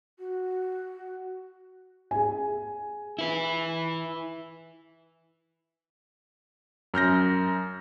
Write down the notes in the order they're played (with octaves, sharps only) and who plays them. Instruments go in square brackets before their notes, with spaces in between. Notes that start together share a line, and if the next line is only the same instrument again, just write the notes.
[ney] F#4
[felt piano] G#4 G#5
[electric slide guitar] E4 B4
[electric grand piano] F#2 F6 G6 A#6